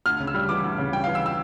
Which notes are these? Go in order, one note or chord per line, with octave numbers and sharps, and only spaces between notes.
D2 F6
C#3
E6
G3
E3 D6
D2
C#3
G3 G5
F5
E3
E6
E6